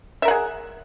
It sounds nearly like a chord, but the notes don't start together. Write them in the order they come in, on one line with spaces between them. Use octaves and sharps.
E5 A#4 F#5 G#4